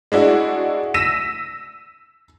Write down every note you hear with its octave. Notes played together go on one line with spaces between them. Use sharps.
G#3 D4 E4 F#4
E6 A#6 B6 D#7 E7